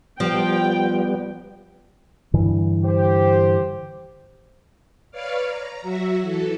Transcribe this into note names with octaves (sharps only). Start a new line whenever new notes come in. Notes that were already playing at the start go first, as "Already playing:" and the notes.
F3 G3 B3 G5
G2 D3 E3
G4 C5
B4 C#5 D5 F5 D6 F6
A#5
F#3 F#4 E5
E3 A4